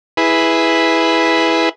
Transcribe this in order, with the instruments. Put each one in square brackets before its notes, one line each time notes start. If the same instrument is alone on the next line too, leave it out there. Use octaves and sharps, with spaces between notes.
[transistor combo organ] E4 G#4 B4